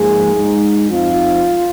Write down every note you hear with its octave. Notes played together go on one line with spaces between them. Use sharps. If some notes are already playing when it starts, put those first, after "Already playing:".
Already playing: G#2 F3 A#3 G#4
G#2 G#3 D#4
F2 F3 C4 D#4 F4